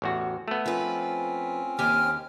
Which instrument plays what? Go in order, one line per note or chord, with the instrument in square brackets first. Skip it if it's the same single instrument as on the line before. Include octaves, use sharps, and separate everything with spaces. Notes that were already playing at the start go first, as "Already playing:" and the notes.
[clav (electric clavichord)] A1 E2 F#4
A3 B3
[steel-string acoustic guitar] F3 B4 [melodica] C4 C#4
[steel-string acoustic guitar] D#2 G4 G#5 [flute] F6